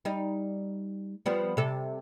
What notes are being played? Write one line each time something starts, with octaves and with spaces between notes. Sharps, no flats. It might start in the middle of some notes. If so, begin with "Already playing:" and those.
G3 D#4
F3 G3 B3
C3 A4